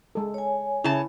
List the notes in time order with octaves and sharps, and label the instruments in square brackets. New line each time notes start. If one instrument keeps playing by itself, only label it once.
[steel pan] G#3 A4
[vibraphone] C#5 G#5
[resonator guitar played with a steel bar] C#3 A5 [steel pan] E4